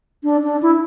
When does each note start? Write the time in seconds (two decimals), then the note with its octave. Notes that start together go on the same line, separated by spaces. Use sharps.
0.24 D4
0.44 D4
0.62 E4